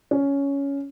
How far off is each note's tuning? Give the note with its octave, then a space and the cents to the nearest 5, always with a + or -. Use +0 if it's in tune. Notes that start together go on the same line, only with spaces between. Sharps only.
C#4 +10